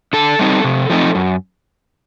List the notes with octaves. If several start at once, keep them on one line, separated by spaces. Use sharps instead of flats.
D3 A4
G3 C4 D#4
C3
F3 A3 C4 D#4
F#2